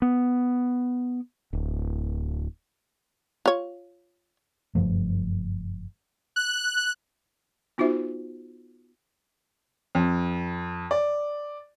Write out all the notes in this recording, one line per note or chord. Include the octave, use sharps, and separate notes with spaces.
B3
D1
F4 C#5
F#1 G2 F3 A3
F#6
B3 D#4 F4 F#4 C5 E5
F2
D5